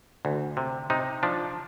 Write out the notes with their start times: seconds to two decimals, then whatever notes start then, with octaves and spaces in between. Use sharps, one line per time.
0.25 D2
0.57 C3
0.90 C3 D#4
1.23 F3 D4